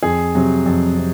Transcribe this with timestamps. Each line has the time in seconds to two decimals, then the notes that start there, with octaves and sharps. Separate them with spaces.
0.03 F2 G#4
0.35 C3 F#3
0.66 F2
0.97 C3